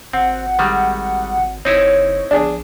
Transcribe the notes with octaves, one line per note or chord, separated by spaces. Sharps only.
G#1 C4 F#5
D#3 G3 G#3
F#1 C4 D#4 E4 C#5
A#1 D4 G#4